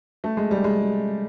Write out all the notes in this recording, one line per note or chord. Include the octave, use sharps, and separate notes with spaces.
A3
G#3
G3
G#3